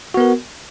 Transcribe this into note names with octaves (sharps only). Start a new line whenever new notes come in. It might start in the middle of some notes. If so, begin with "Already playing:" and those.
B3 F#4 A#4